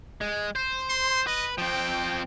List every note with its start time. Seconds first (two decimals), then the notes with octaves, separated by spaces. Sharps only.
0.21 G#3
0.56 C5
0.90 C6
1.27 B4 D#5
1.58 F3 C4 G5